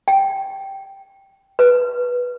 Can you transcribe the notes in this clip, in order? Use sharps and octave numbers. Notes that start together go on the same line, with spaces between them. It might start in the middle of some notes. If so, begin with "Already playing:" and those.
G5
B4